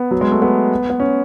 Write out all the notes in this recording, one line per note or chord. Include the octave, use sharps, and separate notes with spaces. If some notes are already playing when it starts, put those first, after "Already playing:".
Already playing: B3
F#3
G#3
A3
B3
B3
C#4